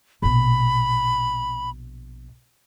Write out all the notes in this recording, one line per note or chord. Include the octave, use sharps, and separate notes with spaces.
A#1 B2 B5